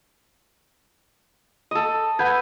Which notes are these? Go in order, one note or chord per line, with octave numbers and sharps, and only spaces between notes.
A4 D#5
B4 F#5 G6 G#6